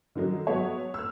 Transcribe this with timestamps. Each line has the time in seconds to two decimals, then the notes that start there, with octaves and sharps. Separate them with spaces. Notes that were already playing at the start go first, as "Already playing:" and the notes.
0.15 D3 D#3 F#3 D#4
0.47 F#3 G#3 B3 C#5
0.94 E6 F6